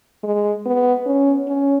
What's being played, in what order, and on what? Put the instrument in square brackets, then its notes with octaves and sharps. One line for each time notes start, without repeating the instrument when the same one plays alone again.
[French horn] G#3
B3
C#4
C#4